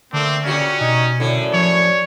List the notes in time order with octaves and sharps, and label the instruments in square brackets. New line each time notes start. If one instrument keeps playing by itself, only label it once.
[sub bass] D3 [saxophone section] A3 A#3 D4 [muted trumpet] C4
[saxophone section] A#2 C#3 [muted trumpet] C#4 [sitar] D4 F#4 G4
[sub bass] B2 [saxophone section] D#4
[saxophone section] F#2 A2 [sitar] D3
[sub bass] F3 [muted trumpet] C#5 [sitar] D5